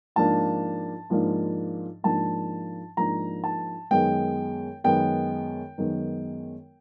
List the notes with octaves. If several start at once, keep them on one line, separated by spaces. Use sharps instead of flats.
G#2 F3 A#3 D4 A5
G#2 F3 A#3 D4
G#2 F3 A#3 D4 A5
G#2 F3 A#3 D4 A#5
A5
F#2 D#3 G#3 B3 G5
F#2 D#3 G#3 B3 G5
F#2 D#3 G#3 B3